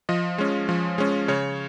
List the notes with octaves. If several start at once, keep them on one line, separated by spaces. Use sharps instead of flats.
F3 D#5
G#3 C#4
F3
G#3 C#4
C#3 C#5